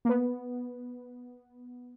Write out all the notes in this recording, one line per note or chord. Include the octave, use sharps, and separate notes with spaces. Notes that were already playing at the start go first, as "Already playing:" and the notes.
A#3
B3